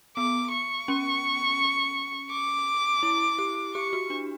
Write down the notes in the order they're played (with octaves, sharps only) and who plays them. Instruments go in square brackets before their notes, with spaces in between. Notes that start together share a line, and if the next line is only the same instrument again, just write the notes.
[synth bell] B3 [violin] D6
[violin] C#6
[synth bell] C#4
[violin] D6
[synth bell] E4
G4
[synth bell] G4 [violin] C#6
[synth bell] F#4
D4